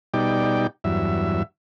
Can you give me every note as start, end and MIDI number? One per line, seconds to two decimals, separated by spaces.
0.14 0.67 47
0.14 0.67 55
0.14 0.67 63
0.14 0.67 74
0.14 0.67 79
0.84 1.43 40
0.84 1.43 43
0.84 1.43 54
0.84 1.43 76